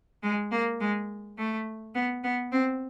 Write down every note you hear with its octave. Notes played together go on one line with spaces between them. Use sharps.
G#3
A#3
G#3
A3
B3
B3
C4